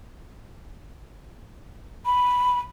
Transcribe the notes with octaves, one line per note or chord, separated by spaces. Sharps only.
B5